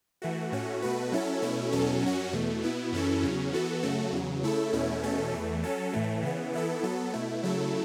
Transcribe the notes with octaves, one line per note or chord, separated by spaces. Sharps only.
E3 A3 F#4
A2 A3 C#4 F#4
B2 A3 F#4 B4
F#3 C#4 E4 A4
B2 A3 C#4 E4
E2 B2 F#3 C#4 A4
F#2 F#3 C#4 F#4
E2 B2 A3
B2 B3 E4
F#2 E3 C#4 E4 A4
E2 C#3 F#3 C#4
E3 B3 F#4 A4
F#2 C#3 A3 F#4 A4
E2 C#3 F#3
C#3 A3 E4 A4
E2 B2 A3 C#4 E4
E2 B2 A3 C#4 A4
E2 E3 A3
F#3 C#4 A4
A2 E3 A3
C#3 E3 B3
E3 B3 E4 A4
F#3 B3 A4
B2 A3 E4
C#3 F#3 A3 E4 A4